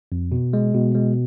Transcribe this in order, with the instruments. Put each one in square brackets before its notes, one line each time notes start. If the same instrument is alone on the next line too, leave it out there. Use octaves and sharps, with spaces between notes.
[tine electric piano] F2
B2
G#3
B2
G#3